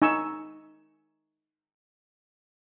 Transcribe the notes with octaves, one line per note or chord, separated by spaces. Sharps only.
D#4 G#5 C#6 E6